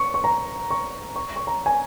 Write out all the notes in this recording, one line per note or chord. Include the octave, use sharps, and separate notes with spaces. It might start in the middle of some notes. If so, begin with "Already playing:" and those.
Already playing: C#6
C#6
A#5
C#6
C#6
C#6
A#5
G#5